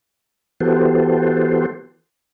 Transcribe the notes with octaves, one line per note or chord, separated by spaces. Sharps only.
E3 B3 F#4 G4 A4 C5